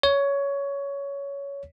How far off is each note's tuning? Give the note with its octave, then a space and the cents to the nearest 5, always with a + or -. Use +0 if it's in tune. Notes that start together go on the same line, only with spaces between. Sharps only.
C#5 +15